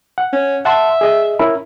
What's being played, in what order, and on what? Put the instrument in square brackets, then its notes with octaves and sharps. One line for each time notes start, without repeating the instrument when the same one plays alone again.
[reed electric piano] F#5
[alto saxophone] C#4
[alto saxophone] E5 [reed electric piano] F#5 A5 C6
[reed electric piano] G#4 D#5
C#4 E4 A#4